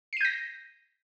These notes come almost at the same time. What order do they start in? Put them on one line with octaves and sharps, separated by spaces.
C7 D#7 G6 A#6